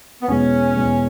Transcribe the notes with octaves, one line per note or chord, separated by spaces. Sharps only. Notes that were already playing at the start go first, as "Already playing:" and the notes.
B3
E2 B2 G#3 C#4
E2 B2 G#3